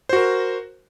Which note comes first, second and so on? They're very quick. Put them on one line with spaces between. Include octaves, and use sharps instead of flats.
C5 F#4 A#4